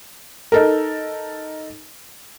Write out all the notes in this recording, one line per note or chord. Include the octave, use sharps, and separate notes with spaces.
D#4 A4 A#4